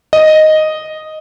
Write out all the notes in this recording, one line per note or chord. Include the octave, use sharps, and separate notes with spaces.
D#5